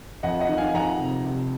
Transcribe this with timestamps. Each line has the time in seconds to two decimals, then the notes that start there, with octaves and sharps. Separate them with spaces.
0.23 F2 D#5 F#5
0.40 D#5 F#5
0.49 D#3
0.58 F5 G#5
0.74 F2 F#5 A#5
1.00 C3
1.25 C3